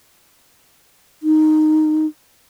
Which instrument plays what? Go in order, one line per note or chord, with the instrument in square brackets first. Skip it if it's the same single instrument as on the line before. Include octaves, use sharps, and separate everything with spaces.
[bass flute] D#4